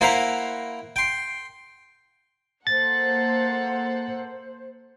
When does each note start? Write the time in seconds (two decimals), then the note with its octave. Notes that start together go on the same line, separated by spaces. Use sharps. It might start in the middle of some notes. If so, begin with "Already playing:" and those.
0.01 A#3 E4 C5 E5 F#5 A#5
0.96 G5 C6
2.67 A#3 A4 C5 F#5 A6